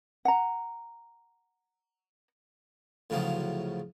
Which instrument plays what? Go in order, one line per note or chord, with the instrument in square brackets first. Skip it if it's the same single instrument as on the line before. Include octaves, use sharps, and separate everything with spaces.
[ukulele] F#5 A#5
[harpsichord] D2 A2 C#3 F3 F#3